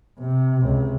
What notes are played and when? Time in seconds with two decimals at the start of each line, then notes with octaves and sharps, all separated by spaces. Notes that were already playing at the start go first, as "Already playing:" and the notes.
0.19 C3
0.61 C#2 C3